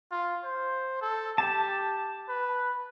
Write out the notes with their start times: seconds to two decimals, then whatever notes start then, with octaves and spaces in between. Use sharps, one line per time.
0.11 F4
0.44 C5
1.01 A4
1.38 G4 A5
2.29 B4